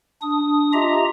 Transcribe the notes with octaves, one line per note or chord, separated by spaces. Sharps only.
D4 D#6
F4 G4 D#5 E5 A#5